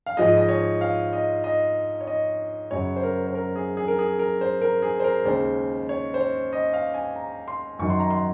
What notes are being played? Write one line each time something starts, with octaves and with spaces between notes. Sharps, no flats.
F5
G#2 F3 G#3 D#5
D#5
C#5
F5
D#5
D#5
C#5
D#5
F#2 C#3 F#3 C#5
C5
A#4
C5
A#4
G#4
G#4
A#4
G#4
A#4
C5
A#4
G#4
C5
A#4
D#2 C#3 G#3 C5
C#5
C5
C#5
D#5
F5
G#5
A#5
C6
F#2 D#3 F#3 C#6
C6
A#5
C6